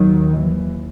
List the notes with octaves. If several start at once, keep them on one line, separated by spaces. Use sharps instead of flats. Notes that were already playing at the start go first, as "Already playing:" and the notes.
Already playing: D#2 D#3 F#3
E3